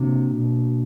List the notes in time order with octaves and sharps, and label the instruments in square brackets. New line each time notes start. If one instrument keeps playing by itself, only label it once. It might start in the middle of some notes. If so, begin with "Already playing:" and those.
Already playing: [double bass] C3 [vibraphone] A#3 D4 F#4
[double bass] B2